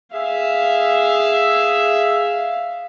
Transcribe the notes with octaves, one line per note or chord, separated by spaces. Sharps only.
G#4 E5 F5